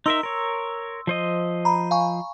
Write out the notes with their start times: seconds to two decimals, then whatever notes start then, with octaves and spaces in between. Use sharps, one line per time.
0.06 D#4 A#4 E5 C6 E6
0.23 A#4 C#5
1.07 F3 C5 D#5
1.65 A#5 B5
1.91 F5 G#5 C#6